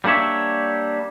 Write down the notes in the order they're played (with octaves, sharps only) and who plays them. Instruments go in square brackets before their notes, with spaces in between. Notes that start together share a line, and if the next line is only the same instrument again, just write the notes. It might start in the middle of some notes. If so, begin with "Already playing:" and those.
[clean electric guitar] G3 A#3 D4 C#5 E5